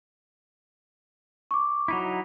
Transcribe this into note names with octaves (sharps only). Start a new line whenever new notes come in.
C#6 D6
F#3 D#4 E4